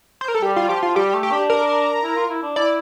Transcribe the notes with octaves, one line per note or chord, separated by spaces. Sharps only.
C5
A#4
A4
G3 G4
F4
F3 G4
F4
G3 G4
A3
G4
D4
A#4
E4
F4
E4
D4
E4 D5